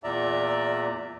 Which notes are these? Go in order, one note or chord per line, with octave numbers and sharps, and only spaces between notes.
E2 A#2 D5 E5 A#5